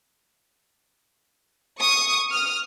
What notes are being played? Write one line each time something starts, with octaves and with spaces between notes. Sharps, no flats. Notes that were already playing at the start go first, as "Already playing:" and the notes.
C#6 D#6
D#6 F6